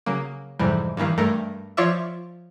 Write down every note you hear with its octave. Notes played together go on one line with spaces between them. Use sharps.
C#3 F#3 A#3
F2 G#2 C3 E3 G3
G2 D#3 E3 A#3
G2 A3 A#4
F3 F4 C#5 D5 E5